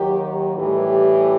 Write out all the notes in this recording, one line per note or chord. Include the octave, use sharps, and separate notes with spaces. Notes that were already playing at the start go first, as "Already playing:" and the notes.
Already playing: D#2 D#3 F#3 G4
A2 E3 G3 G4